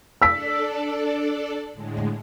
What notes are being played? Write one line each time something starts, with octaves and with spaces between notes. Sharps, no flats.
D4 A4 D5 E6 B6
A2 D3 G#3